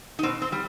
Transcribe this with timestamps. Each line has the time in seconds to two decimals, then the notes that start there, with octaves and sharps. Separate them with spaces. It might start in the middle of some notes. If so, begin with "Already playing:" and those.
0.19 D#4
0.23 B2 C4
0.42 C4
0.52 G3